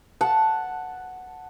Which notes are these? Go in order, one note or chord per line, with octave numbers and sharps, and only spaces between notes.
F#5 A5